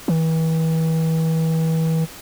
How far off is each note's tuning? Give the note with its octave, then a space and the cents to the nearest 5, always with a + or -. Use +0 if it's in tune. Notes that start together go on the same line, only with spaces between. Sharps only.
E3 -35